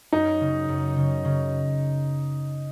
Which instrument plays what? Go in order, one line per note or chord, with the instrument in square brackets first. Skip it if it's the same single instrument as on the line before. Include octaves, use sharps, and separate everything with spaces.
[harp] F#2 [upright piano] D#4
[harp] C#3
F#2
C#3
C#3